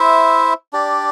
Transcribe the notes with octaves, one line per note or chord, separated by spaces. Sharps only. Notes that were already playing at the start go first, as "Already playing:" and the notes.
Already playing: E4 C5 E5
D4 G4 D5